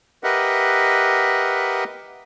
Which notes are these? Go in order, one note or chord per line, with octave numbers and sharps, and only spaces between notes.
G4 A#4 B4 D#5 E5 F#5